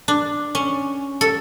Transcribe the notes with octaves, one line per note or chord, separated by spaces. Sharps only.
D4
C#4
A4